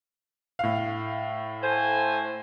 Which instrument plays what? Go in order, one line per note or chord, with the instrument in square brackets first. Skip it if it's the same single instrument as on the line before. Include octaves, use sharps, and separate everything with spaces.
[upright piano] A2 F5
[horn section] A4 C5 G#5